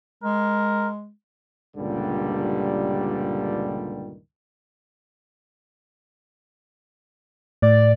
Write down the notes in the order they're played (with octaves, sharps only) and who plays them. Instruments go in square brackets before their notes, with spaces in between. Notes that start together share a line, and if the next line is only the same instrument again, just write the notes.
[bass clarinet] G#3 [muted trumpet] A#4
[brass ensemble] C#2 G2 A#2 D3 D#3 G3
[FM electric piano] A2 [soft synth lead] D5